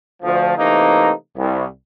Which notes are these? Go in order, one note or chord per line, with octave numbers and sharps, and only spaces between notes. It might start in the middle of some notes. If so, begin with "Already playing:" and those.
D2 F3
C3 E3 A3 A#3 C4 D#4
C2